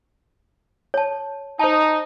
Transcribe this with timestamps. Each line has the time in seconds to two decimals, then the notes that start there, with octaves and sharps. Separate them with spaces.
0.94 C#5 A5
1.59 D#4 C5 A5